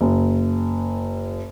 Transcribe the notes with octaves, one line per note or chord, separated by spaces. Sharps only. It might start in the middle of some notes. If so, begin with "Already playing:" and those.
F#1